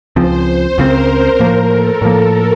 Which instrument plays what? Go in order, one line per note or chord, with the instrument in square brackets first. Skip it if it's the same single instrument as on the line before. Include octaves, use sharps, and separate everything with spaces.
[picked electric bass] C#2 C#3 F3 C4 [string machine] C5
[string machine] C5
[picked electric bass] C#2 C#3 F3 C4 [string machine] A#4
[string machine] A#4
[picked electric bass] A2 F3 A#3 [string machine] A#4
[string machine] A4
[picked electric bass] A2 F3 A#3